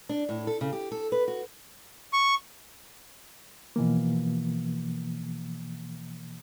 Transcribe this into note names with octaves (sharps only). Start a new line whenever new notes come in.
D4
A2
A4
C#3
G4
A4
B4
F#4
C#6
B2 E3 F3 A#3